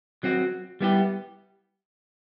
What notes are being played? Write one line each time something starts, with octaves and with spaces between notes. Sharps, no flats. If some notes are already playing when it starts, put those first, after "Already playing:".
F#3 C4 F#4
G3 B3 E4 G4